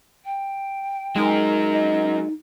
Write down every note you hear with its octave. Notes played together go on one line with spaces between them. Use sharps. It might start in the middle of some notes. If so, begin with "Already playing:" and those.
G5
F#3 G#3 D#4 A#4
D#5